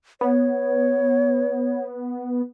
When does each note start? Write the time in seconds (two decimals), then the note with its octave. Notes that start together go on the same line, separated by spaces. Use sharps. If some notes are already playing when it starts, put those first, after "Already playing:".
0.21 B3 C#5